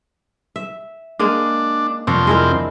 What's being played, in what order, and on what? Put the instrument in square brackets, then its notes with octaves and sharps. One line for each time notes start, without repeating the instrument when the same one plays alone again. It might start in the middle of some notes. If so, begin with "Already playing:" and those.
[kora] E5
[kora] G#3 A#3 G#4 [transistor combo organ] D4
[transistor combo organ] F2 C3 C4 [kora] D4 A#4 C#5
[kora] G#3 E4 A#4